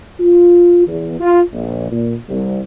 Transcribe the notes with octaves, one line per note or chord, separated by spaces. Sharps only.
F4
E2
F4
A#1
A#2
C2